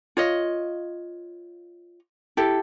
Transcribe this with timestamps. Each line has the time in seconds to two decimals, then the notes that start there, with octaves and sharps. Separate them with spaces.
0.17 F4 C#5 D#5
2.37 E4 G4 A4